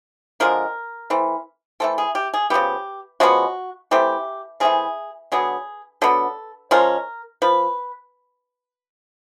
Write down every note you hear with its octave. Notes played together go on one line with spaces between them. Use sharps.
D3 F3 G#3 A#4
E3 A3 C4
E3 A3 C4 A4
G#4
G4
G#4
C#3 F3 G#3 B3 G4
C#3 F3 G#3 B3 F#4
E3 A3 C4 G4
E3 A3 C4 G#4
D3 F#3 B3 G#4
D3 F#3 B3 A4
F3 G#3 C#4 A#4
F3 B4